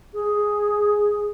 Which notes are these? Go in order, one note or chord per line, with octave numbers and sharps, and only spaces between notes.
G#4